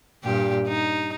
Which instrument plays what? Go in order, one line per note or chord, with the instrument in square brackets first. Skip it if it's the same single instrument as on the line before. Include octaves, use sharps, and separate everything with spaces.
[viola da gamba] G2 A#2 G4
D#4